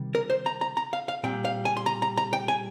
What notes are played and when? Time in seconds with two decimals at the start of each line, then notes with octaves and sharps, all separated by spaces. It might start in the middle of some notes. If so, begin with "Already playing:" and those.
Already playing: C3 D#3 G3
0.15 A#4
0.30 C5
0.46 A#5
0.61 A#5
0.77 A#5
0.93 F5
1.08 F5
1.24 A#2 G3 C4 G5
1.45 F5
1.65 G#5
1.77 C6
1.86 A#5
2.02 A#5
2.17 A#5
2.33 G5
2.48 G#5